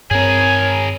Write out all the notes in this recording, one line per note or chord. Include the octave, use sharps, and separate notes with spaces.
G2 C4 G#4 A#4 C#5 G#5